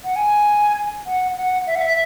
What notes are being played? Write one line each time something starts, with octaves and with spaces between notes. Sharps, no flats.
F#5
G#5
F#5
F#5
E5
F#5
E5